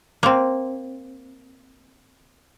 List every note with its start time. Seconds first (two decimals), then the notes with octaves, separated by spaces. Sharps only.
0.23 A#3 C4